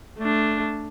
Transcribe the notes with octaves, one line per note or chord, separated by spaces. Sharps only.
A3 D4